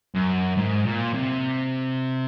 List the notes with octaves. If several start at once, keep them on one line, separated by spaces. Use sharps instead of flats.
F#2
G#2
A#2
C3